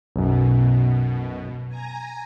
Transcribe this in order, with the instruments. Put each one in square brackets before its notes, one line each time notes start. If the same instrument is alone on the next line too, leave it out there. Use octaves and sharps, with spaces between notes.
[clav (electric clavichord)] B1 F#2 [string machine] B2
[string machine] G#5 A#5